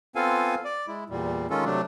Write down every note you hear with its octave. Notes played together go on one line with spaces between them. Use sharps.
B3 C4 F4 A4 F5 G#5
D5
G#3 E4
E2 A#2 G3
D#3 G#3 C#4 F4 A4
C3 F#3 A3 D4